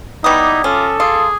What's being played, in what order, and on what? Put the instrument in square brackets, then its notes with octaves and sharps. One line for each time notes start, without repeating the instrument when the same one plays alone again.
[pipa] G3 B3 [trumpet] D#4 [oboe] E4 [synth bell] D6 D#6
[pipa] C#4 [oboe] F4 [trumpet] A4
[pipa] F4 [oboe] G#4